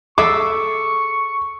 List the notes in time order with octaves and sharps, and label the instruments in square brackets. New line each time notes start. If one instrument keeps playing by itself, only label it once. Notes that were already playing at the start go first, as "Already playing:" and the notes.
[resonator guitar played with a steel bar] G#4 A4 E5 [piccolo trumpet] C#6 [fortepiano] D6